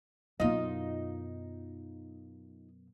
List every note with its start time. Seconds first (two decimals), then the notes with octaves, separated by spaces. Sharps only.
0.40 F#2 B2 D#4 F4 D#5